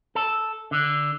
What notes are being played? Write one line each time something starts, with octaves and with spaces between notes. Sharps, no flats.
A4
D3